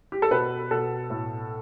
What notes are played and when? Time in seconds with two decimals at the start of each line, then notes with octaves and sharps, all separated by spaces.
0.12 G4
0.22 A4
0.31 B2 B4
0.71 B2 A4
1.10 A2